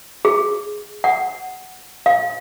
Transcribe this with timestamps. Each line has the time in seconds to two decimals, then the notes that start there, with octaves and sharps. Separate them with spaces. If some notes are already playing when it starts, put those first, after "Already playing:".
0.25 G#4
1.04 F#5
2.06 F5